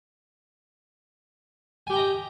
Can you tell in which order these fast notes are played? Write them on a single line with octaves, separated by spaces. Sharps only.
G#5 G4 G5 A#5 D#5